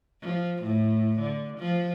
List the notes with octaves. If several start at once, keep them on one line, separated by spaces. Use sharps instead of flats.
F3
A2
D3
F3